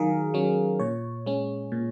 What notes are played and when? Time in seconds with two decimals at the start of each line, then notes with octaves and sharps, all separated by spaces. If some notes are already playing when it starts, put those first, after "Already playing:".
Already playing: D#3 F#3 G#4 A#4 F5
0.34 F#3 C#4
0.80 A#2 C#5
1.26 G#3 C#4
1.72 A#2